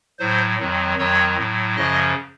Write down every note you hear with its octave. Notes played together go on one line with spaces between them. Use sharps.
A2 F#3 C5
F2 D#3 F#3
F2 D#3 F#3 C#5
A2 F#3
F#2 C#3 F3 D#5